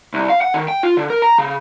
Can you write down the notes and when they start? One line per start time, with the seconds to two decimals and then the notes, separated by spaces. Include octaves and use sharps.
0.14 C2
0.29 F5
0.42 F#5
0.54 D#3
0.68 G5
0.83 F4
0.97 D3
1.10 A#4
1.22 A#5
1.38 C#3